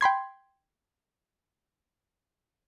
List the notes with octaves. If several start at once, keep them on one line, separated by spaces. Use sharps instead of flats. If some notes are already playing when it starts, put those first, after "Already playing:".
G5 B5 C6 G#6